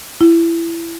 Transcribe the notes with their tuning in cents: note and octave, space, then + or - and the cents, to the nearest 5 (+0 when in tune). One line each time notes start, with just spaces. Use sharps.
E4 +20